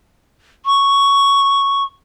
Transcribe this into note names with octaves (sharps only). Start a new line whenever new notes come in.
C#6